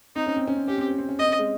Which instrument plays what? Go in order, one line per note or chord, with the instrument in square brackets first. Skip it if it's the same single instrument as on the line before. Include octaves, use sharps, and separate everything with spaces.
[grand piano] C4 [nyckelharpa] D#4
[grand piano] C#4
C4
C#4
C4
[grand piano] C#4 [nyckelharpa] G4
[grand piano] C4
C#4
C4
C#4
[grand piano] C4 [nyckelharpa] D#5
[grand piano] C#4
G#3 C4